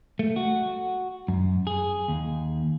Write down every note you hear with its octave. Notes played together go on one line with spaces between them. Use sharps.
A3
F#4
F#2
G#4
D#2